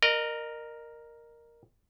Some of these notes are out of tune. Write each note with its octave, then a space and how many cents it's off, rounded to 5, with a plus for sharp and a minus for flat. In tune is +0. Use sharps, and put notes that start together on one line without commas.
A#4 +0 D#5 -35